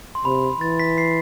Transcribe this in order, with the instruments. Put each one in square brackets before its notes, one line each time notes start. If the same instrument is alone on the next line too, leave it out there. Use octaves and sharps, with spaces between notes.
[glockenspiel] C6
[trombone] C3 [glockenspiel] B5
[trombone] E3 [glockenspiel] A6
[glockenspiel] B6
C7